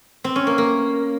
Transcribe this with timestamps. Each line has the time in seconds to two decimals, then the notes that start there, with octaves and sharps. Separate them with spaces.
0.24 C4
0.36 C#4
0.47 A#3
0.58 A#3